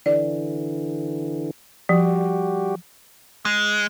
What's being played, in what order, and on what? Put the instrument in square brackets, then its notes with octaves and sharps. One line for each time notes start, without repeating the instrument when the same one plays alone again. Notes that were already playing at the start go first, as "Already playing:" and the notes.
[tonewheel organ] D3 E3 [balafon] D5
[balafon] F3 [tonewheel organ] G3 F#4 G4
[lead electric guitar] G#3